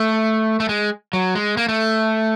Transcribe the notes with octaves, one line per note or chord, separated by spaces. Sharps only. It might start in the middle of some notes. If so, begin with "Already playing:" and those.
Already playing: A3
A3
G#3
F#3
G#3
A#3
A3